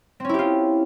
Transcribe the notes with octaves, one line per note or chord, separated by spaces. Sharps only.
C4 C#4 E4 F4 G4